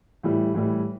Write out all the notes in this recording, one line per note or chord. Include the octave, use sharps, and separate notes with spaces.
A2 E3 G3
A2 E3 G3